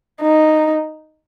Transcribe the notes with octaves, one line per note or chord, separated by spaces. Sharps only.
D#4